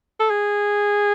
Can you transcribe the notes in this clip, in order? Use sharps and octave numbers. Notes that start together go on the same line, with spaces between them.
A4
G#4